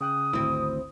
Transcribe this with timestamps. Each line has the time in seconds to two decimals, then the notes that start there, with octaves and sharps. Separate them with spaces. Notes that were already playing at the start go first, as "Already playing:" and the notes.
0.01 C#3 G5 D#6 F#6
0.33 G#1 D2 C4 E4